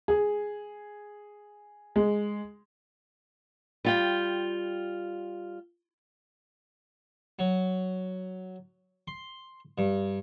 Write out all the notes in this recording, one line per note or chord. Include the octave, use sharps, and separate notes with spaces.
G#4
G#3
G3 F4 G5
F#3
C6
G2